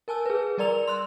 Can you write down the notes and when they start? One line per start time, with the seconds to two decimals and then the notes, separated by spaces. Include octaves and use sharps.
0.08 A#4 G#5 A5 E6
0.26 G#4 B4
0.58 G3 A#4 D5 A#5 F7
0.88 C6 E6 F#6